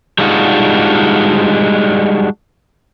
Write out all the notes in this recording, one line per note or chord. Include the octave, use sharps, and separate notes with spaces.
G3 G#3 D4 D#4 F4 F#4